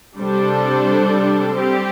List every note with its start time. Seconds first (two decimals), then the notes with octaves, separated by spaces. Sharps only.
0.16 C3 G3 D4 A4 C5
1.56 G3 C4 G4